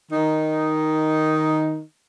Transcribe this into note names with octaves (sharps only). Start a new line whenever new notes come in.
D#3 D#4